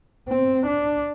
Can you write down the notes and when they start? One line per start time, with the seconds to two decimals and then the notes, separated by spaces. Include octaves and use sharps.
0.29 C4
0.66 D4